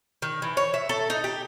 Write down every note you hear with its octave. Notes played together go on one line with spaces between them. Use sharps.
D#3
E3
C#5
E5
A4
D#4
G4